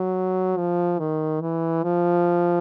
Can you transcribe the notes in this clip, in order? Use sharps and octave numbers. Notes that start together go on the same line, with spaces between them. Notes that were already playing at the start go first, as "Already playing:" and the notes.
Already playing: F#3
F3
D#3
E3
F3